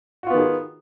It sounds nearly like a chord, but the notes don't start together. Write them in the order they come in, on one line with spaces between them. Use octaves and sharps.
F#4 F4 B3 D#3 G#4